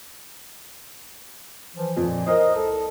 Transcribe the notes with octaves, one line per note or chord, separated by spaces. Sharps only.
E3 F3
F2 A#2
A#4 C5 D#5
C2 A4